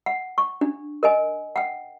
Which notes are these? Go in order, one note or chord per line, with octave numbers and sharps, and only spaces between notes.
F#5
C#6
D4
A#4 D#5 G#5
F#5 G5